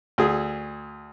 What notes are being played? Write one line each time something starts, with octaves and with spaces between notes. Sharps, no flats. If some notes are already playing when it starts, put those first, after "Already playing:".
D2 G#4